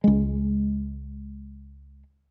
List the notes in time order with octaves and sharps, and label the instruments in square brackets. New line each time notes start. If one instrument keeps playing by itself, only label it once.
[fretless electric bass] C#2 G#3